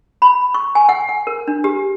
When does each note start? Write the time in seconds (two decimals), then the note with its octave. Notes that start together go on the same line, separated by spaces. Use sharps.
0.22 B5
0.54 C#6
0.75 G#5
0.89 F#5
1.09 F#5
1.27 A#4
1.48 D4
1.64 G4